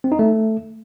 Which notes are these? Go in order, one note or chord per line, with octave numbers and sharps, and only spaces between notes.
C4
D#4
A3